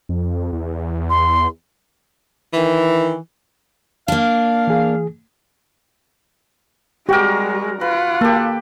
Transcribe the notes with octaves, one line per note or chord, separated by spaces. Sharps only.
F2
E2
C6
D#3 E3
A#3 D4 F5
E3 G#4
G3 G#3 F#4 G4 A#4 G5
F4 B4 F#5
A#3 G4 A4